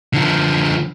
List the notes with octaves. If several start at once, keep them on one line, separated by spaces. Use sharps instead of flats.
D3 F3